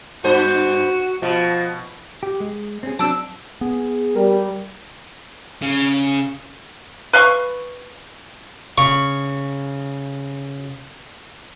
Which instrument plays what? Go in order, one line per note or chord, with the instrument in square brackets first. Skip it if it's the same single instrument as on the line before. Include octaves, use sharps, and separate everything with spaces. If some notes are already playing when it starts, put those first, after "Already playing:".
[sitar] G2 B3 C5 [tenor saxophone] F#4
[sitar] B2 [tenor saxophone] F3
[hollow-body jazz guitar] G4
G#3
C4 C#4 G#4
[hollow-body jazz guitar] F#3 C4 [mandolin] D4 E6
[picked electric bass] B3 [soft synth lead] G#4
[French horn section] G3 [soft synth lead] A#4
[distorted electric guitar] C#3
[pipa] B4 F5 C6 C#6
[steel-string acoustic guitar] C#3 [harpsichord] C#6